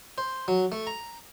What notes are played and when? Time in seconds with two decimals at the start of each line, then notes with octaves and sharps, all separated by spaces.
0.18 C5
0.48 F#3
0.72 A3
0.87 A#5